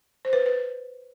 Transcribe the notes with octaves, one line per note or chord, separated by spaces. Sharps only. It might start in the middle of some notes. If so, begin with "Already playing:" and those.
C5
B4
B4